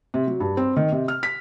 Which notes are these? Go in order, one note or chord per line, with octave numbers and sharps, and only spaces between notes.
C3
F#3
G2
C4
D#3
C3
F6
B6